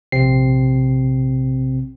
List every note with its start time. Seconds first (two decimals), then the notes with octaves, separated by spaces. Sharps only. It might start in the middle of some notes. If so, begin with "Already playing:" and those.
0.12 A#1 C3 C4 C7